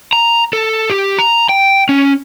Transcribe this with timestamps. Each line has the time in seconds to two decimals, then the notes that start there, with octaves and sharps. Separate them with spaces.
0.13 A#5
0.53 A4
0.90 G4
1.19 A#5
1.49 G5
1.89 C#4